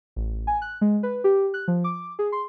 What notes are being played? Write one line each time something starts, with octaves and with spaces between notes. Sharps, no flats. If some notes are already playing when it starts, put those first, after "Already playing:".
A1
G#5
F#6
G#3
B4
G4
F#6
F3
D6
G#4
C6